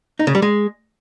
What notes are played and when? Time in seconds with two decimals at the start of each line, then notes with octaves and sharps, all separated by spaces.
0.19 D#4
0.27 C#3
0.35 G3
0.42 G#3